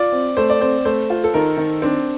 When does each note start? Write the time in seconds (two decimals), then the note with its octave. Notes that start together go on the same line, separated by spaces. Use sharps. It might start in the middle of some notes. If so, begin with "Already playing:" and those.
Already playing: F4 D5
0.12 C4
0.37 A3 C5
0.50 D5
0.61 C4 C5
0.85 A3 C5
1.10 F4
1.24 A4
1.34 D#3 A#4
1.57 D#3
1.82 C4 D4